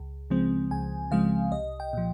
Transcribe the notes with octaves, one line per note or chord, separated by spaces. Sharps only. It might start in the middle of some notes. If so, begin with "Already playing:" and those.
Already playing: C#2
C#3 F3 G#3 C4
C#2 G#5
C#3 F3 G#3 C4 F5
C2 D#5
G5
A#2 F3